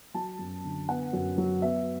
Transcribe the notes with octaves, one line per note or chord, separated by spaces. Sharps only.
F#3 A5
F#2
D3
B3 F#5
F#2
F#3
B3 E5